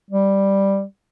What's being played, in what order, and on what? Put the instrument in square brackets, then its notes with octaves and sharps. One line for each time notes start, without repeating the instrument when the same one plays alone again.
[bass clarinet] G3